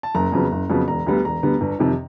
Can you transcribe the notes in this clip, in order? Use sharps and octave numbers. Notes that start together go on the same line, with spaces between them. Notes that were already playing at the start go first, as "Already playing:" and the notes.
A5
F#1 A#5
F2 C#3 F#3 B3
F#1
F2 C#3 F#3 B3
E1 A#5
D2 D3 G3 B3
E1 A#5
D2 D3 G3 B3
G1
F2 C3 D#3